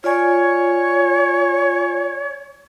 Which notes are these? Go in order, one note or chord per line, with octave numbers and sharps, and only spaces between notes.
F4 C#5 D5 G#5